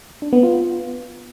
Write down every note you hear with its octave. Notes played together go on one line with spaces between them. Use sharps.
D4
B3
F4